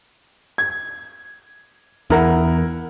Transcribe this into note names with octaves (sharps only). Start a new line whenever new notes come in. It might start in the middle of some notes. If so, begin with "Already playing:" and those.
G#6
E2 E4 A#4 F#5